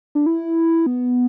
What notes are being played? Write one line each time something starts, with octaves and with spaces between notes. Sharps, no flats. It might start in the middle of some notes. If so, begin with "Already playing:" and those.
D4
E4
B3